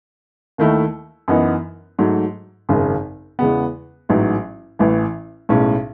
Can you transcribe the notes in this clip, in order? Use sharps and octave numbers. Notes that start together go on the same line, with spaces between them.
D#2 D#3 A3 E4
F#2 E3 B3 D#4
G#2 F#3 A3
G#1 F#2 C#3
E2 C#3 G#3 B3
A1 G#2 F#3
A1 A2 E3
B1 A2 G#3 C#4